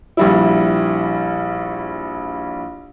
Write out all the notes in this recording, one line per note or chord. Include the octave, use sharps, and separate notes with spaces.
A#1 G3 E4